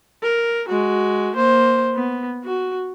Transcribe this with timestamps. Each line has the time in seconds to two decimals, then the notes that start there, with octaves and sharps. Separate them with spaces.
0.23 A#4
0.68 G#3 F#4
1.36 A#3 C5
1.95 B3
2.44 F#4